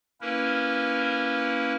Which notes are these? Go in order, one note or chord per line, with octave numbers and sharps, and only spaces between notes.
A#3 C#4 E4 A#4 B4